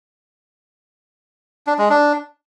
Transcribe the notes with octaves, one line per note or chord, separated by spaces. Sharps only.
D4
G#3
D4